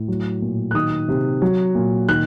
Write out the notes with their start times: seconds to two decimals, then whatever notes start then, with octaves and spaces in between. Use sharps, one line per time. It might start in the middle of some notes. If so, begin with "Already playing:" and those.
Already playing: A2
0.08 F#3
0.42 A#2
0.71 F#6
0.74 D#3 D#6
1.08 C3
1.42 F#3
1.75 A#2
2.09 D#3 F#6